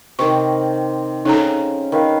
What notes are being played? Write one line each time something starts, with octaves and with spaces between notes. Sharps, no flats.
C3 D#3 C#6
C#3 D#4 A4 A#5
D#3 B4 F5